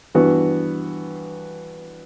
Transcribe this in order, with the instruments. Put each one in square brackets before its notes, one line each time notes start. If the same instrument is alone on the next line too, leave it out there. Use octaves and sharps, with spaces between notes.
[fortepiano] G2 E3 B3 F#4